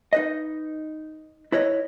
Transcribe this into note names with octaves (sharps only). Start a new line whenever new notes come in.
D#4 B4 D#5
E4 B4 C#5 D#5